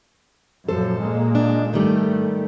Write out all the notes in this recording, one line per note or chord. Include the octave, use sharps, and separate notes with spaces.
F#2 A#2 F3 A4 C5
A#2 G#3 A#3
D4
G#2 D#3 G3 A3